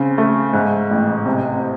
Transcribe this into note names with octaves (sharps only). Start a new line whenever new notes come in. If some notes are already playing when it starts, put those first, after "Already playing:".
Already playing: C#3 C4
A3
G#2
A1
C3